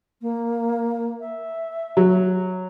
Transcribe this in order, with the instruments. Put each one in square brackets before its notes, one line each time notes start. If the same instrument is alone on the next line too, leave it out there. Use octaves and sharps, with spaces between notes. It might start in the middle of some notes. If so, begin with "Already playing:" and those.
[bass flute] A#3
E5
[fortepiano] F#3